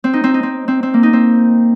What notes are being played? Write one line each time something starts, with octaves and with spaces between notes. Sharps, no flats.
C4
D#4
C4
D#4
C4
C4
C4
A#3
D#4
C4